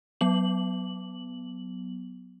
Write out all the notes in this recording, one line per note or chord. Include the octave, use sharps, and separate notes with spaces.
F#3 B3 F#7